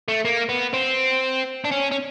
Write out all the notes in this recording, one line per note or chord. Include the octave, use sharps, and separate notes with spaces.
A3
A#3
B3
C4
D4
C#4
C#4